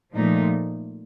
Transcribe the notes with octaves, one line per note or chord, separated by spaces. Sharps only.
A#2 F3 A3 D#4